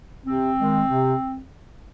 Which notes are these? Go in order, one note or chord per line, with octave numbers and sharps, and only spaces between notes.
C3 C4
D#3 G#3
C3